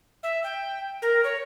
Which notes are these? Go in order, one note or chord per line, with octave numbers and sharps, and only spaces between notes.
E5
G5
A#4
C#5